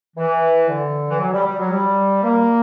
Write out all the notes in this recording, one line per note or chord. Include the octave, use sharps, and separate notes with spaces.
E3
D3
E3
F#3
G3
G3
F#3
G3
A#3